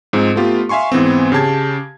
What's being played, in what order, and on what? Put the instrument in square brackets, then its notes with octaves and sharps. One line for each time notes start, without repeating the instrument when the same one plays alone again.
[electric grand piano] G#2 F3 C4
A3 B3 F4 G4
E5 F5 G#5 C6 C#6
G#2 E3 B3 C4
C#3 G4 A5 G#6